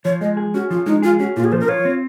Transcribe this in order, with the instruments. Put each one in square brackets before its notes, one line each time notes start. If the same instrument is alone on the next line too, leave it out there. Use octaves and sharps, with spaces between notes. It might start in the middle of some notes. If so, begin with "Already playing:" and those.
[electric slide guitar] F3 [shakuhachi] C#5
[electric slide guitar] G#3 [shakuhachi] D#5
[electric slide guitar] G#4
[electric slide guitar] C#4 [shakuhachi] F#4
[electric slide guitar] F3 [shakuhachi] F4
[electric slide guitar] G#3 [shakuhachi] D#4
[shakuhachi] F4 [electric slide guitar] G#4
[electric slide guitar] C#4 [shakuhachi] F#4
[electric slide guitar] A#2 [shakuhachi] F4
[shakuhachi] G#4
[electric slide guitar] F3 [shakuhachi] C5
[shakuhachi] A#4
[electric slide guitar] F4 [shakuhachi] C#5
[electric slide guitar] C4